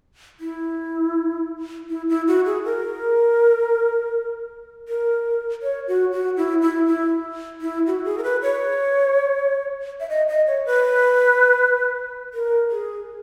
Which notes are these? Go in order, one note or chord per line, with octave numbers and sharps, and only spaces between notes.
E4
E4
E4
F#4
G#4
A#4
A#4
C#5
F#4
F#4
E4
E4
E4
E4
F#4
G#4
A#4
B4
C#5
E5
D#5
D#5
C#5
B4
A#4
G#4